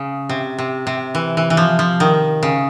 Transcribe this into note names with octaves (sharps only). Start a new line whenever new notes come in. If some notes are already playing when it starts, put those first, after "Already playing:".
Already playing: C#3
C3
C3
C3
E3
E3
E3
F3
F3
D#3
C#3